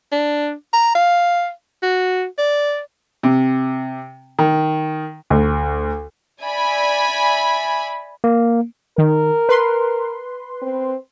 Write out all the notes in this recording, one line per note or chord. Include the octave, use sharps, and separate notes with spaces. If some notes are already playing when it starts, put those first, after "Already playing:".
D4
A#5
F5
F#4
D5
C3
D#3
D2
D5 E5 G#5 B5
A#3
D#3 A#4
B4 C6
C4